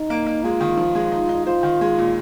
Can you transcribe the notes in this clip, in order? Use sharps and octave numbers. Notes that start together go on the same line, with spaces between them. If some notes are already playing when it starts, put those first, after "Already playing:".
Already playing: D#4
A#3
A#3
G#3 F4
D#3
F3
G#3
D#4
D#4
F4 C5
D#3
G#3
A#2